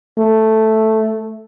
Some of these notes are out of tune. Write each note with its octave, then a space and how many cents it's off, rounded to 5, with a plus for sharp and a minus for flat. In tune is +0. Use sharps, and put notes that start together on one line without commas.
A3 +0